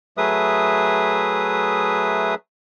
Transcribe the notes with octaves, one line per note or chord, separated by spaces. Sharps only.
F#3 A3 G#4 B4 E5 D#6